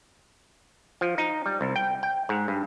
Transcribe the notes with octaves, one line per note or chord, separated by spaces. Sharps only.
F3
D#4
G3
C2
G5
G5
G#2
G2